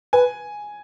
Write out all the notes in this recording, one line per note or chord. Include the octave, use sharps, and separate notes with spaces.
B4 G#5